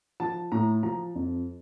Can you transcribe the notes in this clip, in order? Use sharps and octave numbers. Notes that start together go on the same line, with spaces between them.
F3 A5
A2 A#5
F3 A#5
F2